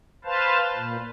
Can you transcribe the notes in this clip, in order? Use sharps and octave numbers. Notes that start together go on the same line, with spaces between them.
B4 C5 F5 A5
A#2